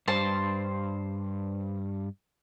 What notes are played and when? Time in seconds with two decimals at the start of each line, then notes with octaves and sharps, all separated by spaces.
0.08 G2 C5 A5